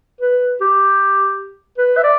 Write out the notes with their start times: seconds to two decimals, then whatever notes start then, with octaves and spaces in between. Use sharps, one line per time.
0.21 B4
0.61 G4
1.78 B4
1.97 E5
2.04 D5